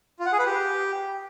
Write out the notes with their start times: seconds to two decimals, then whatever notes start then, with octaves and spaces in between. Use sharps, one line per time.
0.19 F4
0.26 F#5
0.32 G#4
0.39 B4
0.45 G4